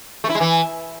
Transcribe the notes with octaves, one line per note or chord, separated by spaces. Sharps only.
A3
E4
G#3
E3